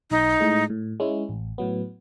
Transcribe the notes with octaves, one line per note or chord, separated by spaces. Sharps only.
B1 D#4
A2 G#3
A2
G#3 C#4 E4
A1
A2 F#3 B3